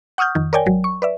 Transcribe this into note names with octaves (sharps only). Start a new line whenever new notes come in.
F#5 C#6 D#6 F6 G6
F2 D#3
A#4 C#5 D5 G5 G#5
G#1 F#3
C#6
B4 D5 E5